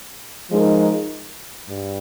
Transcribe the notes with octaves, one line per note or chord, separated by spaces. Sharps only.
F3 G#3 D#4 A#4
G2